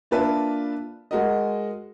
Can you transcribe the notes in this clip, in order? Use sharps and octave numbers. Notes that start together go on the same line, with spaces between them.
A#3 D4 F4 B4 E5 A5
G#3 F#4 A#4 D#5